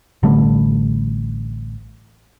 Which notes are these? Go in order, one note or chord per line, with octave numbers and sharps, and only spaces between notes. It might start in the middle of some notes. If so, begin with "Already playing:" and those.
A1 D3 G3 A3